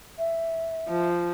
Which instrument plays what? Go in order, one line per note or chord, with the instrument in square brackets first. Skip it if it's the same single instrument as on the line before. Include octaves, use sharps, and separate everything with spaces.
[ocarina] E5
[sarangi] F3